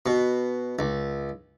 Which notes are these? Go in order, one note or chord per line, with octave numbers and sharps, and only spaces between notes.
B2
C#2